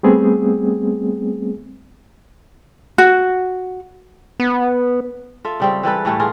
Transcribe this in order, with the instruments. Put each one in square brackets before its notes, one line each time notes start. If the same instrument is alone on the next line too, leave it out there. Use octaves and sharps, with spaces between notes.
[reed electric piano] G3 A3 B3 C4 G#4
[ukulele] F#4
[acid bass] B3
[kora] F4 A4 E5
C#3 G3 C4
E3 G3 A4 B4
A2 E3 G3 A3
F4 G#4 A#4